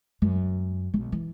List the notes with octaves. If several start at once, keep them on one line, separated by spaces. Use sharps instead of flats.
F#2
B1
E3